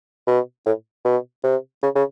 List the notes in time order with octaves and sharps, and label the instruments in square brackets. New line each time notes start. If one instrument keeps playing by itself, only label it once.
[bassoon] B2
A2
B2
C3
C#3
C#3